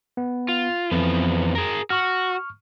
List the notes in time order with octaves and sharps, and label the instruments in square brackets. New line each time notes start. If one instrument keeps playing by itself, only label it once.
[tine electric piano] B3
[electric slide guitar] F4
[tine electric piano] F2 [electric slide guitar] E3 F3 B3
[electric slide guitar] G#4 A#4
[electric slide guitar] F#4 [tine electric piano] C#6 F6